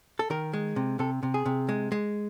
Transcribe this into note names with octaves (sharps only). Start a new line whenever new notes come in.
A4
D#3 A#4
G#3
C3
C3 A4
C3
G#4
C3
G#3
G#3